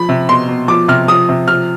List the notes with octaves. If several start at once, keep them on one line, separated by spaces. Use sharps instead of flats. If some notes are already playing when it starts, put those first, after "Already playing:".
Already playing: F3 B5
C3
B2 C6
B2
F3 D6
C3 F6
F3 D#6
C3
F3 F6